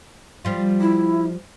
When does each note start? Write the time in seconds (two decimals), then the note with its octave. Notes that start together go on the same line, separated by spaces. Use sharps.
0.45 F3 G3 F4
0.80 E4